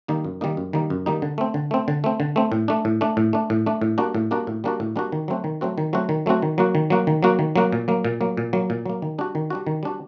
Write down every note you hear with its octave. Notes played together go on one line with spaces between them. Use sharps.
D#3 G3 A#3 D#4
F#2
D#3 G3 A#3 D#4
F#2
D#3 G3 A#3 D#4
F#2
D#3 G3 A#3 D#4
D3
A3 C4
D3
A3 C4
D3
A3 C4
D3
A3 C4
A2
A3 D4
A2
A3 D4
A2
A3 D4
A2
A3 D4
A2
G3 A#3 D4 F#4
A2
G3 A#3 D4 F#4
A2
G3 A#3 D4 F#4
A2
G3 A#3 D4 F#4
D#3
F#3 A3 C4 F#4
D#3
F#3 A3 C4 F#4
D#3
F#3 A3 C4 F#4
D#3
F#3 A3 C4 F#4
D#3
F#3 A#3 F#4
D#3
F#3 A#3 F#4
D#3
F#3 A#3 F#4
D#3
F#3 A#3 F#4
A#2
F#3 A#3
A#2
F#3 A#3
A#2
F#3 A#3
A#2
F#3 A#3
D#3
G3 D4 F#4
D#3
G3 D4 F#4
D#3
G3 D4 F#4